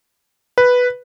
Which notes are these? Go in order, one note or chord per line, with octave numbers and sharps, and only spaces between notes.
B4